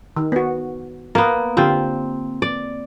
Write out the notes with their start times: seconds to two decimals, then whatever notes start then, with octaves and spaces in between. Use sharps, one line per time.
0.16 D#3
0.32 B3 F#4
1.15 A#3 B3 A#4
1.57 D3 C4 F4 G4
2.42 D5